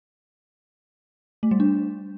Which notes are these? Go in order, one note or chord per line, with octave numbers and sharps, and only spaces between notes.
A3
G3
D4